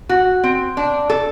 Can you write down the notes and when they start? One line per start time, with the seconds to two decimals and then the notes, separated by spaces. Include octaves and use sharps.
0.09 F#4
0.44 C4
0.77 D4
1.10 A4